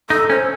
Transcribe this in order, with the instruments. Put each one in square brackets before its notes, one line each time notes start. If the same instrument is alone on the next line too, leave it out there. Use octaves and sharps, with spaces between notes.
[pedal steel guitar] D#4 [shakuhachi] A4
[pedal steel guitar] C#4 [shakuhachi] C5